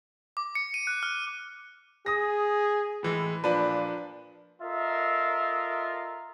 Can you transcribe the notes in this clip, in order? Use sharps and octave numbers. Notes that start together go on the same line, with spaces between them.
D6
C#7
D#7
F#6
F6
G#4 D#6 A#6
A2 E3 G#3
A#2 F3 D4 B4
F4 A4 A#4 D#5 E5